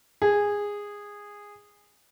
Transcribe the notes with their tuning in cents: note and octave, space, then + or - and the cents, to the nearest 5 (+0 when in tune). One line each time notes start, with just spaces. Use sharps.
G#4 -15